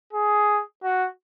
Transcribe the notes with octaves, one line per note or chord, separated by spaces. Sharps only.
G#4
F#4